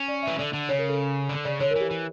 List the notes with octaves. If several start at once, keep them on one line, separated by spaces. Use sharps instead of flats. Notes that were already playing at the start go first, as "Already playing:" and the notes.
Already playing: C#4
D5
E3 E5
D3 D5
D3
C#3 C#5
A#4
A4
D3
C#3 D5
D3 C#5
E3 A#4
G4
E3